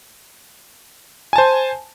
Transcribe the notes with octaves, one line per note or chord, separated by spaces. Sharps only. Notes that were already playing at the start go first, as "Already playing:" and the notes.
C5 G#5 A5